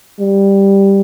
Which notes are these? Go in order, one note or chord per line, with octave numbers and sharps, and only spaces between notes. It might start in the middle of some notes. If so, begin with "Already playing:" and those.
G3